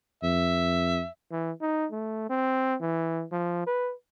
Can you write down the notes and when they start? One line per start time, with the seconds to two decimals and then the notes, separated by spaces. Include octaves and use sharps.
0.23 F2 E5
1.31 E3
1.61 D#4
1.92 A3
2.30 C4
2.81 E3
3.32 F3
3.67 B4